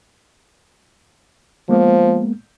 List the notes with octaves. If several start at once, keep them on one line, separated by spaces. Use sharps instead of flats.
F3 G#3 A#3 B3